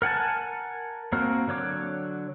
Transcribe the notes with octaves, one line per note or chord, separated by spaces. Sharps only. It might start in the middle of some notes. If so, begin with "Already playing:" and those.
A#4 F#5 G#5 A5
A#3 C4 F#4 A#4
D3 F#3 C#5 D6